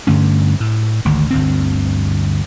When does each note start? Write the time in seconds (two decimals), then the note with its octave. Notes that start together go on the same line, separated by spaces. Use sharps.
0.07 G2 D3 A3 C#4
0.60 A2
1.05 G#1 D2 G#2
1.31 G1 D2 C4